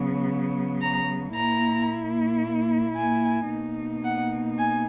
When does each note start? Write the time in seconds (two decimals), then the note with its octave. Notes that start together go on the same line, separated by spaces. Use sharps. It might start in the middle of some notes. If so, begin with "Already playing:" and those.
Already playing: C#3 F#3 B3
0.81 A#5
1.34 A#2 A#3 E4 A#5
2.96 G#5
3.51 B2 A#3 D#4
4.04 F#5
4.58 G#5